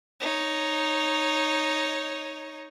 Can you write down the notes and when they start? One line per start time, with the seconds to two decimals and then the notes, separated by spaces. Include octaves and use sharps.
0.20 D#4 C#5